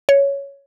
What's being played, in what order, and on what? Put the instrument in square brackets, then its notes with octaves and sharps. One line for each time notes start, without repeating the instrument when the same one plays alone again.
[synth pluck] C#5